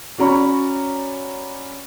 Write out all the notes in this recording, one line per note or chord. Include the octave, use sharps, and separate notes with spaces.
C#4 F#4 D5 A#5 B5 C#6